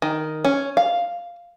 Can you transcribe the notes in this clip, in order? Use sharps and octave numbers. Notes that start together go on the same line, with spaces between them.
D#3
C#4
F5